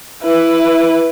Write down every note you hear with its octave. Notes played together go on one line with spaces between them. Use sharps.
E4 B4